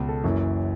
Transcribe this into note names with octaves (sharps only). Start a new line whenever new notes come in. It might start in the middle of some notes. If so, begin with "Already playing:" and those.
Already playing: C#2 B2
A4
F#1 F#2 E3